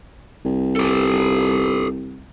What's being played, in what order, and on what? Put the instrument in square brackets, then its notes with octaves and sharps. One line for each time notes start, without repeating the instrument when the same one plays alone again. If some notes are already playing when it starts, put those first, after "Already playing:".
[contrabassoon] C2
[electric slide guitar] G4 A4